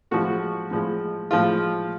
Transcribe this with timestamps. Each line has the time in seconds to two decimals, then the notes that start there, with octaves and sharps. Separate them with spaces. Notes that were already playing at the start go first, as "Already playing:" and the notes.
0.11 A2 F3 G#3 F#4
0.71 A2 F3 G#3
1.31 A2 F3 G#3 F4